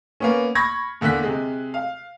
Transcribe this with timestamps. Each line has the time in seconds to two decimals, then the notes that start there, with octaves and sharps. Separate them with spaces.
0.20 A#3 B3 C#4
0.55 B5 C#6 G#6 A#6
1.01 E2 D3 A#3 F#6 B6
1.23 C3 G#3
1.74 F5